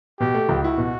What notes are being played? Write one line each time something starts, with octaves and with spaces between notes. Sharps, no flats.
B2 G4
A3
C#2
E4 F#4
B2